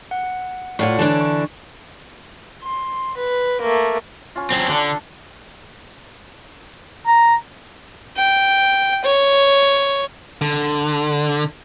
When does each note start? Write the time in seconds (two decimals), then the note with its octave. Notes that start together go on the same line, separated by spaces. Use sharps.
0.11 F#5
0.79 A2 F4 C#5 D5 F#5 C#6
0.99 D3 E3 D4 A5
1.21 C#6
2.63 C6
3.17 B4
3.61 A3 A#3
4.36 C#4 F4
4.51 F#3 C4 G#5 A5
4.69 D3 D4
7.07 A#5
8.16 G5
9.04 C#5
10.41 D3